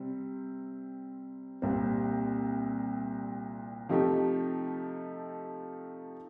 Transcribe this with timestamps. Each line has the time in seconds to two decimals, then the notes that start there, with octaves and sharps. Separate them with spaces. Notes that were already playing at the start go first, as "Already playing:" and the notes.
Already playing: C3 G3 C4
1.62 C2 A#2 G3 C4
3.89 C3 F3 A3 D#4 G4